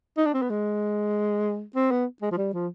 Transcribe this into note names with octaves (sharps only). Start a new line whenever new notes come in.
D#4
D4
C4
B3
G#3
C4
B3
G#3
F3
G3
F3